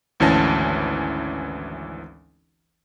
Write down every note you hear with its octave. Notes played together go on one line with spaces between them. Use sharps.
G#1 D2 E3 C#4 A5 A#6